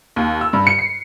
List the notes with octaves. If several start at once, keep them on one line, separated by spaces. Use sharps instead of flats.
D#2
E6
G2
C#7
C7